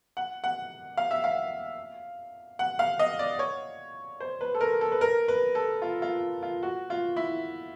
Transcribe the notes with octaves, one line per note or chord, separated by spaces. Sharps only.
F#5
F#5
F5
E5
F5
F#5
F5
D#5
D5
C#5
C5
B4
A4
A#4
A4
B4
A#4
B4
A4
F4
F4
F4
F#4
F4
E4